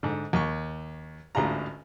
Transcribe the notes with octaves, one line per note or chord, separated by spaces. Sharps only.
G#2 D3
D#2 C#6
A1 D2 G#2 F4 A#5